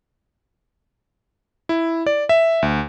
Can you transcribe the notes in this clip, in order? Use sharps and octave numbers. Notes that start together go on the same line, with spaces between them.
E4
D5
E5
D2